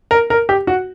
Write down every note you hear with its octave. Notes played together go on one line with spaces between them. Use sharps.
A#4
A#4
G4
F#4